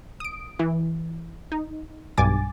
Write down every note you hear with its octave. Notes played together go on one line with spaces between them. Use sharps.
D#6 D7
E3
D#4
B1 G2 G#5 D6 A6